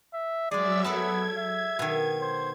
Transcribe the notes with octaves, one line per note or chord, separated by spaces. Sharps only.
E5
F#3 G#3 G#4 D5 E5 E6
B3 A4 D5 A5 G#6
E5
B2 D#3
C5